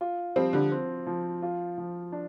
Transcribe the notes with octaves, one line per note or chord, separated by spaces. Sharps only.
F4
F3 G3 C4
D3 G3
C4
F3
F4
F3
D4